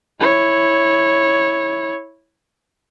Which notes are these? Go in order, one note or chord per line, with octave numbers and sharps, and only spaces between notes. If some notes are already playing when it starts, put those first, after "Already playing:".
E4 C#5